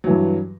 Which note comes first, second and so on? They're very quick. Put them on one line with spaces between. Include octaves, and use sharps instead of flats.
F#3 E3 G2